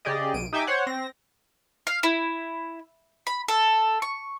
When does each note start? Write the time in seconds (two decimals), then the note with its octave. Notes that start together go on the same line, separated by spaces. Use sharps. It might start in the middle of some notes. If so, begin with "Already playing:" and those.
0.05 C#3 G4 G#4 D5 D#5
0.34 B1 D7 D#7
0.53 D#4 G4 E5 G5 G#5 D6
0.67 C5 C#5 F#5
0.87 C4 A#6
1.87 F5
2.03 E4
3.27 B5
3.48 A4
4.02 C#6